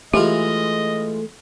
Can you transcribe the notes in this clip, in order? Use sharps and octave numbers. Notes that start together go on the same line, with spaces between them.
E3 G#3 A3 F4 G4 D#5